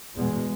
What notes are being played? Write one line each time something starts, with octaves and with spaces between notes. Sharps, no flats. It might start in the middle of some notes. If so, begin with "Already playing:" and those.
E2 B2 G#3